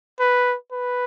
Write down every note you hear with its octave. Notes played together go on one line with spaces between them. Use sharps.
B4
B4